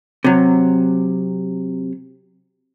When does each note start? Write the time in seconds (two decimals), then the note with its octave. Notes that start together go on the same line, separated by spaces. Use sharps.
0.24 C3 F#3